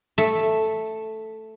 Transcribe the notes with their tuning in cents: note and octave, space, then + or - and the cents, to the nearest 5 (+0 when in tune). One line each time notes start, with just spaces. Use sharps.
A3 +0 E5 +0